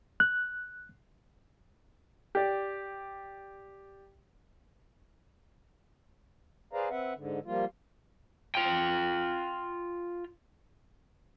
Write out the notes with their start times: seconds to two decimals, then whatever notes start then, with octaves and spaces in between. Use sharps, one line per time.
0.20 F#6
2.35 G4 D5
6.73 G#4 B4 C5 D5 F5 A#5
6.90 C4 B4 E5 F#5
7.15 G#2 D3
7.46 F3 G3 A#3 F4
8.55 F4 G5